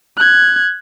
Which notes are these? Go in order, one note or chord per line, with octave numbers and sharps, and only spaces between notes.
F#6 G#6